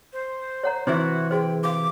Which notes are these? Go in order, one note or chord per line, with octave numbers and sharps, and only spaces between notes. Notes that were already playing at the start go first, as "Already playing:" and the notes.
C5
C#5 F#5 A#5
C3 E3 E4 F#4 C5
F#4 G#4 C5 G5
F#4 F5 D6